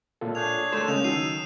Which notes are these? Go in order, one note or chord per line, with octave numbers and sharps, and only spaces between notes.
A#2 F4 A4
D4 G#4 C#5 G6 F7
A3 A4 C6 E7
C#3 G#3 A#3 C#4 D#6 G6 F7
D#3 F#3 G#4 A4 C7 D#7 F7